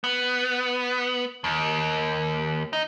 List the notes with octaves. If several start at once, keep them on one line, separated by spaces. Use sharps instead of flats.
B3
D#2
D#4